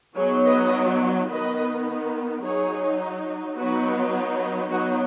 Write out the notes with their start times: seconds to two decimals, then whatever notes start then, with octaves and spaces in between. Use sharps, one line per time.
0.16 F#3 B3 D#4 G#4 C#5
0.45 B4 D#5
1.30 D#3 B3 D#4 B4 D#5
2.44 F#3 D#4 G#4 C#5
3.57 F#3 B3 D#4 F#4 B4
4.71 F#3 B3 D#4 F#4